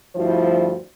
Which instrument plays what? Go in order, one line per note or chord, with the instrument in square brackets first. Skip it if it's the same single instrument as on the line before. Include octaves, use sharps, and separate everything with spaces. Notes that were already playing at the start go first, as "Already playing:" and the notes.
[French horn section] D2 G2 F3 E4 F#4 C5